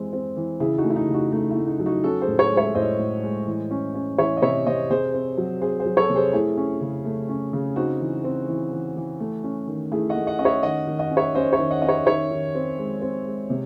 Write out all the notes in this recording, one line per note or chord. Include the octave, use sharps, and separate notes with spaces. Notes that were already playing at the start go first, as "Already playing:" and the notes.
Already playing: E3 G#3 C4
C4
E3
C#3 E4 G#4
D#4 F#4
A3
E4
D#4
C#3
D#4 F#4
A3 D#4
E4
A3
D#4
F#3
D#4 F#4
C#4 F#4 A4
G#4 C5
A2
A4 C#5
G#3
C#5 E5
A2 C5 D#5
A2
G#3
E3
C#4
C#4
E3 C#5 E5
D#5
C3 C#5 E5
C3 C5 D#5
C3 G#4 C5
C4
F#3
C4 G#4 C5
G#4 C5
F#3
A4 C#5
C3
G#4 C5
A3 E4 G#4
C#4
C#3
A3
C#4
C#3
C4 D#4 F#4
E3
C4
E3
E3
E3
A3
C#4
D#3
A3 E4 G#4
D#5 F#5
A3
D#5 F#5
C#4 D#5
C#5 E5
D#3 D#5 F#5
D#3
D#5 F#5
C#4
C#5 E5
C#4 C5 D#5
C#5 E5
D#3
D#5 F#5
C#4 D#5
C#5 E5
D#3 C#5 E5
D#3
C4
G#3
C4
G#3
C3